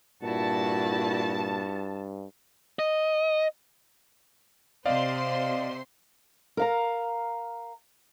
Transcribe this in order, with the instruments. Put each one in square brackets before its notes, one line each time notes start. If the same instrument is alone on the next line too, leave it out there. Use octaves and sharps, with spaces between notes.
[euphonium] G2 [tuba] A#2 [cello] E4 F#4 [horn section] A5
[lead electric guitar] D#5
[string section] C3 C5 C6 [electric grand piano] D5 D#5 F5
[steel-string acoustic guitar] A#4 F5 A#5